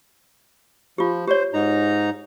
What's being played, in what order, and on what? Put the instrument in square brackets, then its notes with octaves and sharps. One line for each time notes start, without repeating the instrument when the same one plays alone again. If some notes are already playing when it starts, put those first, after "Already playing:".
[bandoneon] F3 [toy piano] F4 G4
[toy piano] G4 C#5 [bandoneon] C5
[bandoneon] G#2 D#4 A#5